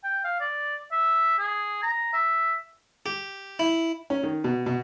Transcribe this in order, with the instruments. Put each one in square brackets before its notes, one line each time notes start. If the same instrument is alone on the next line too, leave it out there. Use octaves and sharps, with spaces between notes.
[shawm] G5
F5
D5
E5
G#4
A#5
E5
[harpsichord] G4
E4
[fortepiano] C#4
D#3
B2
B2